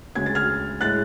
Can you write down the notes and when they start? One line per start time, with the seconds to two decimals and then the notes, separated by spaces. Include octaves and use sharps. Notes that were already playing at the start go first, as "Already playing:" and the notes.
0.15 D2 C#3 G#3 G#6
0.26 A6
0.35 F6 G#6
0.81 A2 G#3 F#6 A6